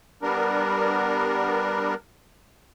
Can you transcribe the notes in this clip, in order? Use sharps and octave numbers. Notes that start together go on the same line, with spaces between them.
G3 B3 D4 A#4